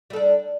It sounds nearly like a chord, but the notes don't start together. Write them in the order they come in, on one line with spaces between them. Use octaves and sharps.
G3 A4 D4